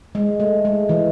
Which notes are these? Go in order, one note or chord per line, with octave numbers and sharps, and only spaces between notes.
G#3
A3
G#3
E3